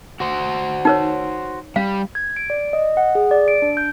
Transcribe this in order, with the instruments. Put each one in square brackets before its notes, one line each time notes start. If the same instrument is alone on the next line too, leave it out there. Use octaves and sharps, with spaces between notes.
[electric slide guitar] F#4 C5
[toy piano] D#4 A#4 C#5
[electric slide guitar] G3 [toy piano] F5
[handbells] G#6
D7
D5
D#5
F#5
G#4
D5
D7
D4
G6